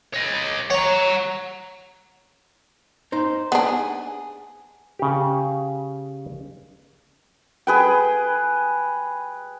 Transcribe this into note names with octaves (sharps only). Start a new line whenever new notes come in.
C#5 D#5
C#5 F#5 A#5
D#4 C5
B3 D4 G#4
C#3 G4
G#4 B4 G5